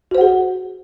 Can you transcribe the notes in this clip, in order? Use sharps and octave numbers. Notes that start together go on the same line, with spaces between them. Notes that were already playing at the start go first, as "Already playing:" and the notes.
F#4 G#4 C5 F#5